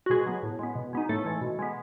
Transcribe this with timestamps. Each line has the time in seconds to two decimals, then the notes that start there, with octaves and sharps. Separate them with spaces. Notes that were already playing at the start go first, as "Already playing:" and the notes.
0.06 F#4
0.10 B2 G#3 G#4
0.26 F#3 B3
0.43 A2
0.59 G#3 B3
0.76 B2
0.93 G#3 B3 D#4
1.09 A2 A3 A4
1.25 E3 G#3
1.41 B2
1.59 G#3 B3